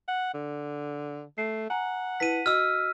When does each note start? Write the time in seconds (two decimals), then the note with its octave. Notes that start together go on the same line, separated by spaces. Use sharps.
0.08 F#5
0.34 D3
1.38 A3 C7
1.70 F#5 G#5 A#5
2.20 E4 B4 A5 B6 D#7
2.46 F#4 D#5 E6 F6